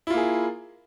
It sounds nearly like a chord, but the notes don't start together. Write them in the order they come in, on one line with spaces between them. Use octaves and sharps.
E4 F4 A#3 G#4